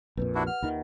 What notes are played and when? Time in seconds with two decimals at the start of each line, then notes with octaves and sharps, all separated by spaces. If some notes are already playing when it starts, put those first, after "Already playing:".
0.17 A#1 F2 A#2 B4 C#5
0.35 D4 E4 F#4 G4 C#5
0.47 F#5 F6
0.63 D#2 D#3 F4 E5 F#5